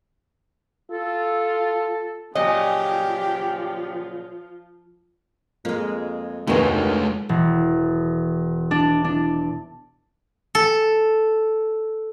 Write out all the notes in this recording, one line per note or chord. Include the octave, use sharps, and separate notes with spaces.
F4 A4
A#2 C#3 F3 F#3 F4 G4 D#5
F2 G#3 A#3
F1 D2 D#3 G#3 B3 F4 G#4
E1
D4
D4
A4